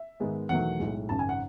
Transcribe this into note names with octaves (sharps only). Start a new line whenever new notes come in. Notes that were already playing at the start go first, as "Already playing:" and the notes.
Already playing: E5
G#2 D#3 G#3 B3
E1 E2 D#3 F#3 A3 F#5
B1 A2 G#3
G#1 F#2 C#3 A5
G#5
F#5